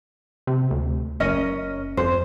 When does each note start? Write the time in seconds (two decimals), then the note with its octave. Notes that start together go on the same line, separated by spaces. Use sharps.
0.47 C3
0.71 D2
1.20 F#1 C#4 A#4 D#5
1.97 F2 C5